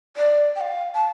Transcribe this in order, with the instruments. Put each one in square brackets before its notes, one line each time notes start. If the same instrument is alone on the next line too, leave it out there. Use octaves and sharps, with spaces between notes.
[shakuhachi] D5
G5
F5
A5